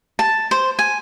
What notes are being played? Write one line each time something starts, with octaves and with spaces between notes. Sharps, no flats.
A5
C5
G#5